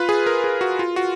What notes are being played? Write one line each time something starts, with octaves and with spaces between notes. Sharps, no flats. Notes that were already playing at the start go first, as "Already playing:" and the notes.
Already playing: F4 B4
G#4
A#4
G#4
F#4
F4
F#4